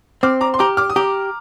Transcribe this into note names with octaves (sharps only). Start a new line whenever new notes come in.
C4 D6 F6
A#5 D6
C6
G4 A#5 D6
D6 F6
D#6
G4 A#5 D6